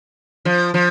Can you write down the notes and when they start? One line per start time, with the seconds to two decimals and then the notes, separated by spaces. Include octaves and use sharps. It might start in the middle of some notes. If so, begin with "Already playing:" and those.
0.45 F3
0.74 F3